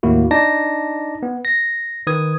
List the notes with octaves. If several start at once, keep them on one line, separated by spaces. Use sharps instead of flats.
D#2 A2 A#3 E4 F#4
D4 D#4 D5 A5 A#6
B3
A#6
D#3 B4 D#6 G#6